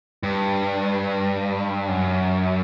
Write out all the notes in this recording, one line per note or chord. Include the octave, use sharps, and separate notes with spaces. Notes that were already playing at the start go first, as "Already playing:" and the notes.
G2
F#2